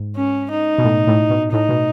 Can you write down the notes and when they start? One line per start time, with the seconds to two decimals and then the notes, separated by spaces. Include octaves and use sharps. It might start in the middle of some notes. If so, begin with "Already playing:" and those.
Already playing: G#2
0.16 C#4
0.50 D#4
0.78 B2
0.84 A2
1.07 A2
1.30 B2
1.52 A2 D#4
1.69 B2